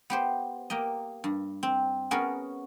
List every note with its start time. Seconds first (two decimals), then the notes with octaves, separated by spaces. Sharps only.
0.10 B3 G4 C5
0.70 A#3 G4 D#5
1.24 G2
1.63 C4
2.11 B3 C#4 F#4 G#4 A#4